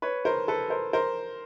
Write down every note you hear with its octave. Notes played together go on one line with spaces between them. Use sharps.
B4 C#5
A#4 C5
A4 B4
A#4 C5
A#4 C5